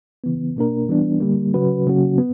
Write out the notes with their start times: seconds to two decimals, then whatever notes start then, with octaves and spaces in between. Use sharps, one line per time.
0.24 C#3 E3 B3
0.56 B2 A#3 D4 A#4
0.89 E3 G3 B3 D4
1.21 D3 G3 A#3
1.54 C#3 F#3 C#4 F#4 B4
1.87 C#3 F#3 A#3 C#4 F#4
2.18 B3